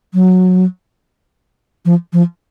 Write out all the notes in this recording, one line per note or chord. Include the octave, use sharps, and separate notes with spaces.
F#3
F3
F3